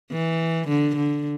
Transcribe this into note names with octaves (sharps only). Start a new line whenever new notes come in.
E3
D3
D3